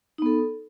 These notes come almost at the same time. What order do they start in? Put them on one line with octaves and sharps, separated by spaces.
D#4 B3 A4